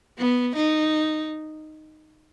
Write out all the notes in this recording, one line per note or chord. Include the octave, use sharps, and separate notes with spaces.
B3
D#4